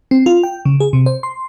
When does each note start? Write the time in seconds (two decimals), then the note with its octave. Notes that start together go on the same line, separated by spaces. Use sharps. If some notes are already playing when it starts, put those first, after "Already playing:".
0.11 C4
0.26 F4
0.43 G5
0.65 C#3
0.80 G#4
0.93 C3
1.06 C5
1.23 C6